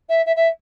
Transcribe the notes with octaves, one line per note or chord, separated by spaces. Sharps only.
E5
E5
E5